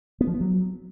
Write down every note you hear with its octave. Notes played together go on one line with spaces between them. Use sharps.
B3
F3
B3
F#3